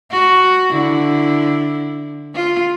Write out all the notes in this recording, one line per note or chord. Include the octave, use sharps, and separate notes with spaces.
F#4
D3 E4
F4